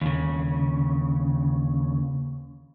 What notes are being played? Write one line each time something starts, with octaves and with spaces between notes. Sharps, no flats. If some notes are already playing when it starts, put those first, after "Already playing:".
D#2 C#3